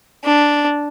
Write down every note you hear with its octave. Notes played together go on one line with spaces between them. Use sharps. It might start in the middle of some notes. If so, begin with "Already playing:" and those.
D4